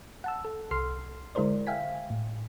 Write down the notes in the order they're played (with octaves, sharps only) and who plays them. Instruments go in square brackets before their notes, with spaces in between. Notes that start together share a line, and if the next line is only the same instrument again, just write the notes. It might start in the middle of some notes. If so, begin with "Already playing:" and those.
[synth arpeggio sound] F#5 A5 E6
A4
C2 A4 C6 F6 C7
D3 G#3 E4 A#4 C5 D5
E5 F5 G5 G#5 B6
A2